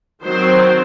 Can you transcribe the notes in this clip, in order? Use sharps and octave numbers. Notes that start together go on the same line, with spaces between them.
D#3 F#3 C4 C5